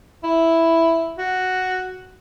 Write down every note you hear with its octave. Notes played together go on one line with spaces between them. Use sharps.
E4
F#4